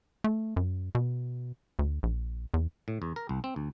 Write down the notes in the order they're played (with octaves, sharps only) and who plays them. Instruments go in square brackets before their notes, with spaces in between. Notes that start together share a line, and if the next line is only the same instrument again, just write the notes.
[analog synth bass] A3
F#2
B2
D2
A#1
E2
[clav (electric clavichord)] A2
E2
A#4
C2
C4
D2